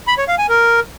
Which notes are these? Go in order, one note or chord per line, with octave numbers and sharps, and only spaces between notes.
B5
C#5
F5
G#5
A#4